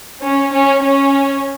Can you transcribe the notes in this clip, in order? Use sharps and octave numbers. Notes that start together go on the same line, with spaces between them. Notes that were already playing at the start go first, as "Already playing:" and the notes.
C#4
C#4
C#4